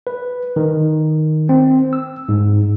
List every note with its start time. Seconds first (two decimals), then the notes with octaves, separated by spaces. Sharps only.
0.07 B4
0.56 D#3
1.49 C4
1.93 E6
2.29 G#2